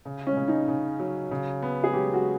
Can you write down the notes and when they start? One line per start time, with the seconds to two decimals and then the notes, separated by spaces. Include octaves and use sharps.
0.05 C#3
0.27 C#4
0.37 C#3
0.48 D#4
0.68 C#3
1.00 F#3
1.31 C#3
1.62 B3
1.84 G#4
1.93 F#3 G4
2.14 F#4